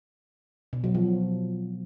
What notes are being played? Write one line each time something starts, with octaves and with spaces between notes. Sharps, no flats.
B2
F#3
F3